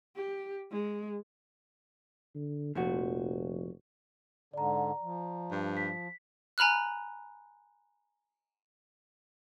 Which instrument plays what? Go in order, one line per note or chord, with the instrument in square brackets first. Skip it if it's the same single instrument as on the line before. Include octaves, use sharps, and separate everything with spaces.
[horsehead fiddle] G4
G#3
[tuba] D3
[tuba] F1 [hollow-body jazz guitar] A#2 F3 F#4
[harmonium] G#2 D3 [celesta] D5 A#5
[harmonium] F3
[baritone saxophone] G2
[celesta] B6
[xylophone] G#5 A#5 B5 F6 F#6